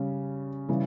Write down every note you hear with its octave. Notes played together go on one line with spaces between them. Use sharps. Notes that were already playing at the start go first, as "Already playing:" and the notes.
Already playing: C#3 G3 C#4
C#3 E3 G3